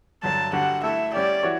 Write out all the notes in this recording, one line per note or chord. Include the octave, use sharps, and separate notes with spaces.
G2 D3 F#3 A5
D3 G3 D4 F#4 F#5
A3 E4 A4 E5
G3 C#4 G4 D5
E3 F#4 C#5